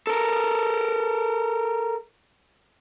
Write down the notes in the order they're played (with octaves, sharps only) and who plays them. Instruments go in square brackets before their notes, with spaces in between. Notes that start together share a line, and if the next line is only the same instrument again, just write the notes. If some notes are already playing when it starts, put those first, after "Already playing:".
[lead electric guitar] A4 A#4